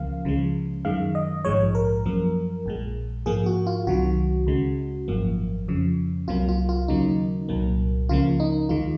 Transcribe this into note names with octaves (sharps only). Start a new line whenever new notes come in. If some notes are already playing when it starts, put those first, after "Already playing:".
Already playing: C#2 C#3 F3 A#3 F5
C#2 C#3 F3 G#3
F#2 D#3 G#3 F5
D#5
A#1 G#2 F3 G#3 C#5
A#4
F#2 F3 A#3
A#1 A#2 G#3
G#2 F3 A#3 G#4
F#4
F4
C2 C3 D#3 F#3 F#4
C#2 C#3 G#3
G#1 F#2 F3 A#3
F2 C#3 F3
C2 C3 F#3 A#3 F4
F4
F4
D#2 C#3 F#3 A#3 D#4
C2 A#2 F#3 A#3
C#2 C#3 F3 A#3 F4
D#4
D#2 D#3 G#3 F4